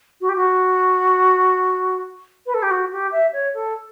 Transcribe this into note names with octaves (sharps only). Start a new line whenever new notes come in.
F#4
G4
F#4
B4
A4
G4
F#4
G4
E5
C#5
A4